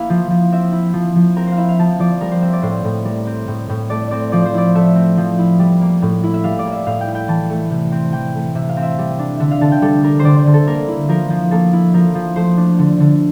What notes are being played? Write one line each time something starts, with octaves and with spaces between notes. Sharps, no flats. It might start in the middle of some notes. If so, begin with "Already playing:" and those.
Already playing: A#3 E4 F5
F3
F3
C4 E5
E4
F3
F3
C4 A#4
C5 F5
E4 E5
F5
F3 A5
F3 D5
G3 A#4
C5
C4 E5
D5
A2 C5
A2
G3 A#4
C4
A2
A2
A3 D5
C4 D5
F3 D5
C5
E4 D5
A3 E5
C4
F3
E4
G3
A#3
A2
E4
E5
G3 F5
D5
A#3
E5
A2 F5
G5
E4
G5
E3 A5
A3
C3
C4
E3 G5
A3
C3 E5
F5
C4
E5
G3
D4
D3 E5
F5
D3 A5
G5
G3 A4
D4 A#4
C5
D3 D5
C5
D3
A4
A#3 A#4
E4
F3 A#4
F3
A#3 A4
E4
F3 A#4
F3
A3 C5
D4
D3
D3